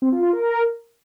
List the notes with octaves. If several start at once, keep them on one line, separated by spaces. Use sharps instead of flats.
C4
F4
F4
A#4